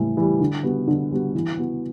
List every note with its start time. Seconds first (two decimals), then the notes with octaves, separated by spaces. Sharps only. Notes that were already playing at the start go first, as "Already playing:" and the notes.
Already playing: A2 E3 G3
0.17 E3 G3
0.40 D3
0.63 G3 B3 F#4
0.88 D3
1.11 G3 B3 F#4
1.35 E3
1.57 B3 F#4